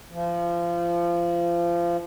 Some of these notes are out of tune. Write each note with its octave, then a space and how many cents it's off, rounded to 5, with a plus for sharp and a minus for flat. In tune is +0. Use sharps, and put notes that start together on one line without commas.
F3 -25